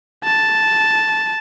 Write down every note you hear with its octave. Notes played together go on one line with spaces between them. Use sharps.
A5